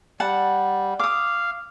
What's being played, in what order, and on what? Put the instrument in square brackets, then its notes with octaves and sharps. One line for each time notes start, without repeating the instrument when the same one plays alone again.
[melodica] G3 [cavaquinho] F#5 A5
[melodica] F5 [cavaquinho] D6 D#6